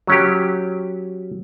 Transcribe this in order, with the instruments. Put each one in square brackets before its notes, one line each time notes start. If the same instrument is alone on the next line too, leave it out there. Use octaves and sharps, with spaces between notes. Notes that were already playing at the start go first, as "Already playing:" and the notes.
[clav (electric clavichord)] F#3 C#4 G4